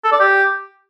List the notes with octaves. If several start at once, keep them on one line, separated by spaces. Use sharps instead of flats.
A4
D5
G4